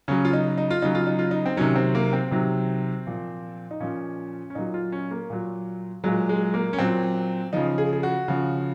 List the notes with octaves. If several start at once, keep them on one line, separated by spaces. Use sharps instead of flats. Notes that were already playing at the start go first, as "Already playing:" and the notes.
C#3 F#3 C#4
F4
D#4
D#4
F4
C#3 F#3 D#4
F4
D#4
F4
D#4
C4
C3 D#3 F#3 C#4
C4
A#3
C4
C3 D#3 F#3
A#2 F3
D#4
A#2 F3 C#4
C#4
A#2 F#3 D#4
F4
C#4
A#3
A#2 F#3
A#2 F#3 G#3
G#3
A#3
C#4
A#2 F#3 C4
C#3 F3 D#4
G#4
G#4
F#4
C#3 F3